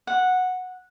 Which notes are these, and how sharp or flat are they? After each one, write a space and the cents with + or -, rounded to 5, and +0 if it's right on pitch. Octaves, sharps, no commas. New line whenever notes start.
F#5 -10